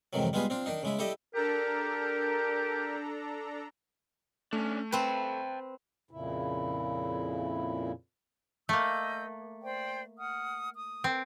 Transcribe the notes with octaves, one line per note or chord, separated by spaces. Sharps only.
F2 G#2 C3 D#3 E3 F#3
G3 G#3 B3 F4 G#4 B4
C4 D4 F4
D#3 D4 D#4
C#3 G#3 E4
E4 G4 A4 D5 D#5
D4 G4 A4 A#4 A#5
A3 C#4 D4
C4 B4 G5 A5
F2 A#2 C#3 E4
A3 A#3 D#5 E6 G6
C5 D5 G5
F#5 D#6 F6
D#6
C4 A#4